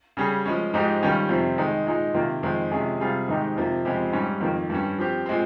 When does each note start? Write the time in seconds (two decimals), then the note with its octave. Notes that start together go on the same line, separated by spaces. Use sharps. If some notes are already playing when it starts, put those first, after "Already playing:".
0.17 C#3 G3 C#4 G#4
0.45 F3 G#3 C#4
0.74 G#2 F3 G#3 D#4 G4
1.02 D#3 G3 C#4 F4
1.29 F2 C3 F3 C4
1.58 D#3 G#3 D#4
1.87 A#2 G#3 D#4
2.14 C3 D#3 A#3 F4
2.43 F2 D#3 G#3 C4
2.71 C3 F3 G#3 C#4 G#4
3.00 C3 G3 C4 F4 G#4
3.28 G#2 D#3 G#3 D#4 G4
3.56 F2 C3 F3 A#3
3.85 F2 C#3 G#3 C4 G4
4.13 G#2 G3 C#4
4.41 F2 D#3 A#3
4.70 G2 G3 C#4
4.98 F3 C4 G4
5.26 A#2 G#3 C4